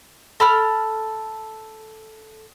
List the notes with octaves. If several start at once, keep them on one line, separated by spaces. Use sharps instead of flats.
A4 B5 F6